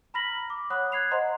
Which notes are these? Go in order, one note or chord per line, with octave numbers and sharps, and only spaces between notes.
A#5 B5 F6 A#6 B6 F#7
D6
C#5 F#5 B5 D#6 F#6
F#6 G#6 C7 F7
C5 D#5 F#5 A#5 C6